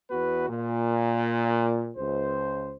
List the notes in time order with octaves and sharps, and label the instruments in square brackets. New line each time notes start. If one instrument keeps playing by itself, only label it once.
[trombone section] E2 B3 F#4 B4
A#2
C#2 C5